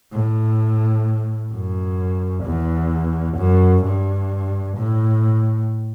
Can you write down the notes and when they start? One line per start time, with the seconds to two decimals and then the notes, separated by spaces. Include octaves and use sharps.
0.12 A2
1.52 F#2
2.45 E2
3.38 F#2
3.84 G2
4.77 A2